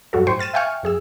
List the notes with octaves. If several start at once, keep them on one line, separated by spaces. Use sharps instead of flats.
G2 F#3 G3 F#4 A4
A2 C5 G5 C6 C#6
F6 A6 D#7 E7
E5 F5 G5 G#5 C#6 F6
F#2 G#4 E6